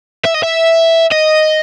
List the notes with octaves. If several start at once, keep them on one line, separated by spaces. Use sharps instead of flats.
E5
D#5
E5
D#5